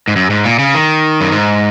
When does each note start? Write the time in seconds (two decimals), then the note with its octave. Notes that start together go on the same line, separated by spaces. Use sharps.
0.08 G#2
0.16 F#2
0.30 G#2
0.45 A#2
0.59 C#3
0.74 D#3
1.21 F#2
1.32 G#2